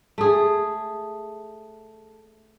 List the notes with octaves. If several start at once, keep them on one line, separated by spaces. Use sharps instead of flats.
A3 G#4